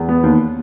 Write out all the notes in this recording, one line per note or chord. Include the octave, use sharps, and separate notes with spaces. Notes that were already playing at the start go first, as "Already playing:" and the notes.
Already playing: E2
B3
D#2